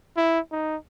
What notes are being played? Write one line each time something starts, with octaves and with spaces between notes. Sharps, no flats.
E4
D#4